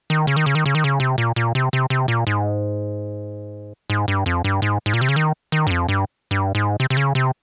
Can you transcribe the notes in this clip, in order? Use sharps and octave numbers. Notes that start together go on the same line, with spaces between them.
D#3
C#3
D#3
C#3
D#3
C#3
D#3
C#3
C3
A#2
A#2
C3
C3
C3
A#2
G#2
G#2
G2
F2
G2
G#2
G#2
A#2
C3
C#3
D#3
D#3
G2
F2
G2
G2
G#2
C3
C3
C#3
C3